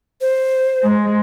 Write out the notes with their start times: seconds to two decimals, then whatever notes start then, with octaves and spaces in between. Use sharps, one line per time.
0.21 C5
0.84 G#3